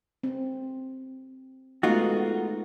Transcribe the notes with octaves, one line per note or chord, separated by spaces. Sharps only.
C4
G#3 A3 B3 D#4 F4 F#4